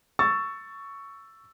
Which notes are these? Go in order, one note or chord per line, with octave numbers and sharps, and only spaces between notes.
C#6 E6 A6